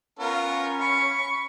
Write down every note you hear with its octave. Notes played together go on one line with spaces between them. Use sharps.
B3 C#4 F4 A#4
B5 C#6